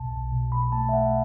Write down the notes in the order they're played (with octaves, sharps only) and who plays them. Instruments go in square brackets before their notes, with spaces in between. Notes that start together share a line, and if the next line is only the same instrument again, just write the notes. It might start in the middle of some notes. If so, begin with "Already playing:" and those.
Already playing: [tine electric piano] B1 B2 A5
B1
B2
B2 B5
A3 A5
E5
A3 F#5